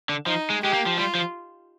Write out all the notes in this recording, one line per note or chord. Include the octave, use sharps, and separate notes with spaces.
D3
F3 D#4
G#3
G#3 G4
A#3
F3
G3 F4
F3